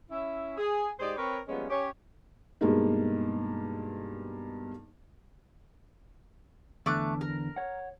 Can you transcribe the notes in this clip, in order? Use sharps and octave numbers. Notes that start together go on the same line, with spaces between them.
C#4 E4 E5
G#4
G#2 G4 G#4 C5 D5 D#5
C4 A#4 B4 C#5
F3 G3 G#3 A#3 B3 C#4
C#4 G4 C#5
G2 B2 G#3 A#3 D#4
E2 D3 A3 D6 F#6
A#4
C#5 F#5